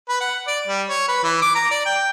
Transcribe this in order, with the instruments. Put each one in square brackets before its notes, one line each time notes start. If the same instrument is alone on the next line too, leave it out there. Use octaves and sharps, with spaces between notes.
[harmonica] B4
F#5
D5
G3
C#5
B4
E3
D6
A#5
D5
G5